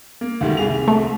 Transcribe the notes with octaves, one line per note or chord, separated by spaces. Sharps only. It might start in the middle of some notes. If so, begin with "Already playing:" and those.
A#3
D2 D#3 G3
C2 G#4 F7
A3